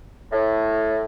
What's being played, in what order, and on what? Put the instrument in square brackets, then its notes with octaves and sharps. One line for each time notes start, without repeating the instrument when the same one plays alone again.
[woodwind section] A2